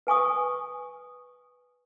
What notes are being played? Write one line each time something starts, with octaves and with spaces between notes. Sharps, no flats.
B4 G#5 C#6 D#6